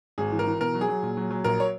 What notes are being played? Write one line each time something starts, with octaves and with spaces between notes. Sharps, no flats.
G#1 G#4
E3
A#4
E3
B2 A#4
F#3
G#4
F#3
A#2
F#3
F#3
A#1 A#4
C#5